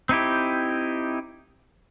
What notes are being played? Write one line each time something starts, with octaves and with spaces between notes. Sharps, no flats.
C4 D#4 E4 G4